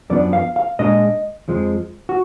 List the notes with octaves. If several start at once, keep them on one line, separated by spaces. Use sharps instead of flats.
F#2 F3 B3 D4 D5
F5
F5
A#2 G#3 D4 D#5
F2 F3 G#3
F#4